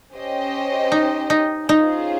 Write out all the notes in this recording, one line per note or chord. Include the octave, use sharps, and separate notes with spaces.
C#4 G4 C5 D#5 G5
D#4
D#4
C#4 D#4 F4 G#4 C5